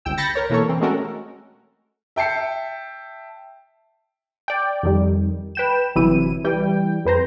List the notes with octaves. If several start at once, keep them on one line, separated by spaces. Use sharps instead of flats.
G1 C#2 G5 E6
B5 G6 A6 A#6 C#7
A#4 C#5
B2 E3 A#3 A4 C#5
E3 C4
G#3 A3 C#4 F#4 A4 A#4
E5 G5 A5 C7 C#7
D5 G5
F2 D#3 G3
B4 G5 E7
G1 C3 E3 F#3 E4 D#7
E3 G3 G5
F2 B4 C5 A#5